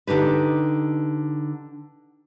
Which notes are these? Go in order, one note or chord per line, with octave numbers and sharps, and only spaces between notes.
D3 D#4 G4 B4